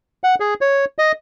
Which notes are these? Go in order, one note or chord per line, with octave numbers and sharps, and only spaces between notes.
F#5
G#4
C#5
D#5